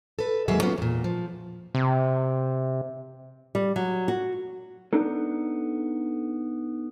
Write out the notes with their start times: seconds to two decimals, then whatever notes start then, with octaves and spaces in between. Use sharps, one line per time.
0.19 A4 B4
0.48 D#2 F#3 G#3 A#3 G#4 E5
0.62 F#3 A#3 B3 C#4 F4
0.78 E2 A#2
1.04 F3
1.75 C3
3.55 G3
3.76 F#3
4.08 F#4
4.93 B3 D4 D#4 A4